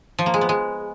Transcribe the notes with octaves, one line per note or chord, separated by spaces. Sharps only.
F3
A#3
G#3
B3
G#3